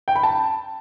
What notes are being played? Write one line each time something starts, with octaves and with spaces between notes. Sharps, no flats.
G5
B5
A5